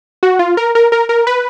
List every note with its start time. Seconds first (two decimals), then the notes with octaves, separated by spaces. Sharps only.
0.23 F#4
0.39 F4
0.57 A#4
0.75 A#4
0.92 A#4
1.09 A#4
1.27 B4